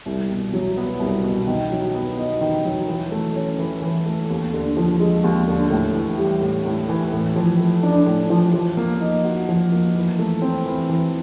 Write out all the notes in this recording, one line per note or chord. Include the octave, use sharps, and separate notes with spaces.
C2
B2
F#3
B3
C2
B2
D#3
F#3
B3
D#4
D#3
F#3
E3
A3
C#4
E3
E3
A3
D#2
D3
F3
G#3
D#2
D3
A2
E3
G3
A2
A2
E3
A2
F3
A3
D4
A2
F3
F3
A#3
D#4
F#4
F3
A#3
E3
A3
C4
E3
E3